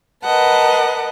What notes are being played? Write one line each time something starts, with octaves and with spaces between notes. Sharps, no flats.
A#4 B4 D#5 F#5 A5